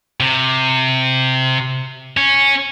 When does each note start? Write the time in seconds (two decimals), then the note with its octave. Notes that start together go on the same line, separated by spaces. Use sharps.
0.20 C3
2.17 C#4